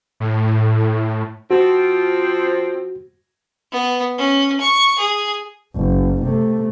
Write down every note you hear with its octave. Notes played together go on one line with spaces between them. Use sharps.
A2
F3 C4 F#4
B3
C#4
C#6
G#4
F#1
C3 A3